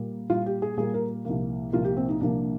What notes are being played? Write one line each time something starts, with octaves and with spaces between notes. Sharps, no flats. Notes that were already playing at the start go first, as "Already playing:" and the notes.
Already playing: A#2 G3 A#3
A#2 G3 A#3 F4
G4
G#4
A#2 G3 A#3 G#4
A#4
C2 A#2 F3 A#3
C2 A#2 F3 A#3 F4
G4
C4
D#4
C2 A#2 F3 A#3 D4